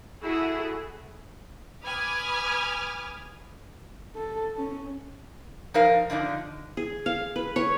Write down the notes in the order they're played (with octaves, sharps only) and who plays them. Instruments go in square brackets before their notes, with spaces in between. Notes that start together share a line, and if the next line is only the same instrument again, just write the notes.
[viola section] E4 F#4 G#4 A4
[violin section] B4 G#5 B5 D6 D#6 F6
[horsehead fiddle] A4
C#4
[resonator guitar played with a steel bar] F3 D#4 A#4 F5
D3 F3 D4 D#4
[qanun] G#4
F5
B4
C#5